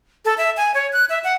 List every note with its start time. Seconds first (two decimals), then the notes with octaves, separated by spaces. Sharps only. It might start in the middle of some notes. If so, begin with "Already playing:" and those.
0.25 A4
0.38 E5
0.57 G#5
0.74 C#5
0.93 F#6
1.09 E5
1.24 F#5